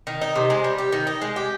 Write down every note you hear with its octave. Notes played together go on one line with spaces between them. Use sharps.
D#3
D#4
C3
G#3
G3
G4
D#3
D#4
G#3
G4